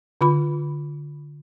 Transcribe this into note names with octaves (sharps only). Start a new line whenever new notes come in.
D3 F4 B5